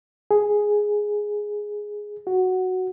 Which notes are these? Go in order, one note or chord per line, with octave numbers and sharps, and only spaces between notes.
G#4
F#4